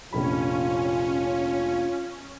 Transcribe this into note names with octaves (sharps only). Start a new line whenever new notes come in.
F1 A#1 C#4 F4 B5